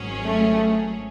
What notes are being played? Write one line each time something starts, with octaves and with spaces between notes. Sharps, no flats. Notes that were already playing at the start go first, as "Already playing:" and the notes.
Already playing: G#1 G#2 F#3 C#4 G#4
A3